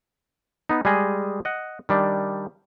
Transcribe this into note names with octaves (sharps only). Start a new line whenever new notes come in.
B3 D#4
G3 G#3 G#4 D#5
D#5 F#5
D#3 G3 D4